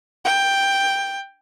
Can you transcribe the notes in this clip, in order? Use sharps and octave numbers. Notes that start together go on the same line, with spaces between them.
G5